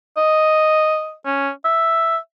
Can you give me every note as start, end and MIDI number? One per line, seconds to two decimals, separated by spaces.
0.17 1.14 75
1.25 1.50 61
1.65 2.17 76